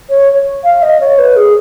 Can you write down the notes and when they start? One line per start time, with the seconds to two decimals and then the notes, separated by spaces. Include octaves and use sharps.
0.10 C#5
0.64 F5
0.82 D#5
1.01 C#5
1.19 B4
1.36 G#4